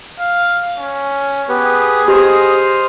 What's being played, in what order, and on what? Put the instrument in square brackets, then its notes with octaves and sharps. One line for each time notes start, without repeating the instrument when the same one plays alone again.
[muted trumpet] F5
C#4
[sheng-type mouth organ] B3 G4 B4 [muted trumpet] G#4
[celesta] G4 [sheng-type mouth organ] C5 D#5 F6